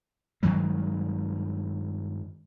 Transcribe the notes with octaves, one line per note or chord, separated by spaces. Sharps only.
G2 D#3 F#3 G#3